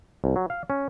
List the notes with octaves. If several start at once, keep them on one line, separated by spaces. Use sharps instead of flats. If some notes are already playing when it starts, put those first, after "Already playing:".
C2
F#3
F5
C#4